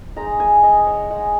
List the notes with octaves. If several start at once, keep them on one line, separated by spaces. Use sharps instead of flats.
G#3 D#4 A#5
G#5
D#5
C#5
G#3 D#4 F#5